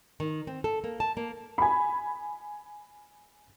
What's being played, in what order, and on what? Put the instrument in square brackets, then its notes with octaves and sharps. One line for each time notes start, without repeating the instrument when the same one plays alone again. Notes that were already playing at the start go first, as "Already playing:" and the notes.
[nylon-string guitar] D#3
C4
A4
A#3
A5
A#3
[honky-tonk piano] G#5 B5